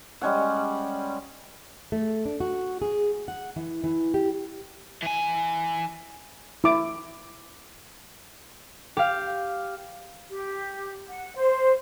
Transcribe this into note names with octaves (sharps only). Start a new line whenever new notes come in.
G3 G#3 C#4 F#5
A3
D4
F#4
G#4
F#5
E3
E3
G4
E3 G#5
E4 D6
G4 F5
G4
F#5
C5